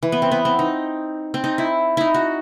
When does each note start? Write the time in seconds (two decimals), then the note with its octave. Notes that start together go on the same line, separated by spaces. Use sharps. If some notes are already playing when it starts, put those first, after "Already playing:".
0.03 E3
0.12 B3
0.22 C4
0.31 B3
0.45 C4
0.59 D#4
1.34 C4
1.44 D#4
1.58 E4
1.97 D#4 E4
2.14 F#4